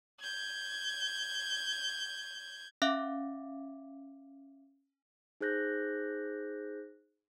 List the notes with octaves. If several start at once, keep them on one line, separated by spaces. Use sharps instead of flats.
G6 G#6
C#4 E5 F5 D6
D#4 G#4 C5 F#6 G6 A#6